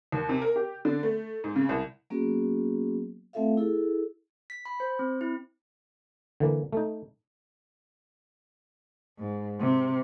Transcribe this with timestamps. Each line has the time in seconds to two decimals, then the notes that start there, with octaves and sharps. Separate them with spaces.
0.12 D#2
0.29 C3
0.42 A#4
0.56 G4
0.85 D3
1.03 A3
1.44 G#2
1.56 C#3
1.69 C2
2.10 F#3 A#3 B3 C#4 F#4 G#4
3.33 A3 C4 F4 A4 E5 F5
3.57 E4 G#4 A4
4.50 B6
4.65 B5
4.80 C5
4.99 C4
5.21 E4
6.40 D3 E3 A#3
6.73 A3 D#4
9.19 G#2
9.60 C3